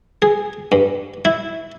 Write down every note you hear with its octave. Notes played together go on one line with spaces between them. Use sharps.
G#4
G2
E4